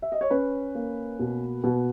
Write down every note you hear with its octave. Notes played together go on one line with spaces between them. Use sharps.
E5
D#5
C#5
C#4 B4
A#3
B2
B2